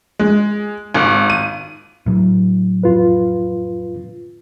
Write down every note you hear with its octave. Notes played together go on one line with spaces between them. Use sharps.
G#3
G#1
D#7
A2 F#3
F2 F4 B4